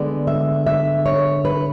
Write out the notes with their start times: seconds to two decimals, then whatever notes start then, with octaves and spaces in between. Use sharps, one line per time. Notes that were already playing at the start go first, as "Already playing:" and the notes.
Already playing: D3 G#3 B3 D5
0.27 E5
0.66 E5
1.06 C#5
1.45 B4